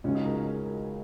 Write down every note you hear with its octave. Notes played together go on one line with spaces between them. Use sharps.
C#2 C#3 G#3 C#4 F#4
D#4 G#4
F#4 A#4
D#4 G#4
A#4
F#4 A#4